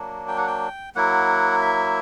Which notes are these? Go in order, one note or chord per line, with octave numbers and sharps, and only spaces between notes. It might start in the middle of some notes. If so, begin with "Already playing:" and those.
Already playing: F#3 A#3 D4
G5
F#5
G5
F#3 A#3 E4 F#5
E5